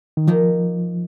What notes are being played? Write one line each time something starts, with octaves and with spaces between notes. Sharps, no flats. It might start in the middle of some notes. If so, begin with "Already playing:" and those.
D#3
D#3 F3 A#3 D#4